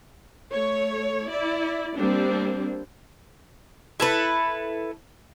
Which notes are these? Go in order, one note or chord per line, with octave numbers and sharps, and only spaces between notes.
A3 C#5
E4 D5
G3 A#3 C4 D4
E4 A4 B4